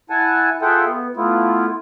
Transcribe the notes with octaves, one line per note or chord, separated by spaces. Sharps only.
E4 F#5 G#5 A5
F4 G#4 A4 E5 F#5 G5
B3
A3 B3 E4 F4